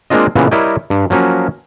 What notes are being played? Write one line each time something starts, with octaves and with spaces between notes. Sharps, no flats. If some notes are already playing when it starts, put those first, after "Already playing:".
G#3 A#3 C4 D4 F4 D#5
A#2 C#3 E3 B3
G3 E4 A#4 C#5 D#5 G5
G2
F3 F#3 A#3 C#4